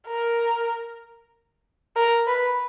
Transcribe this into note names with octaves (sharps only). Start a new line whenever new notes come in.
A#4
A#4
B4